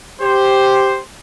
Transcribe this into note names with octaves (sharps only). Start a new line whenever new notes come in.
G4 C5